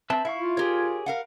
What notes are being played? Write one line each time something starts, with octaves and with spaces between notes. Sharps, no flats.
C4 B4 E5 A5
E4 E5 F5 C#6
F4
G4 G#4 A#4 C#5
A#4 F5 F#5